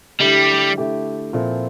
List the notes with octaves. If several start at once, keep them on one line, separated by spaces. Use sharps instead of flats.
D3 G3 A3 E4 G4
D3 A3 E4 G4
A#2 F3 C4 E4 A4